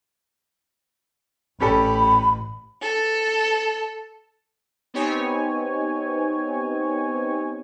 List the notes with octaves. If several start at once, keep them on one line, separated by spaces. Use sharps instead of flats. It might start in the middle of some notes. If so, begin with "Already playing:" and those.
A1 C#4 G4 A4 B5
A4
B3 C4 D#4 G4 C#5 G#5